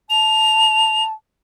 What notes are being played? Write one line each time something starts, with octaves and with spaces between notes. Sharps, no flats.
A5 F7